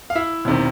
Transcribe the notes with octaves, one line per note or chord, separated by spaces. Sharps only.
F5
E4 E5
E1 C3 D#3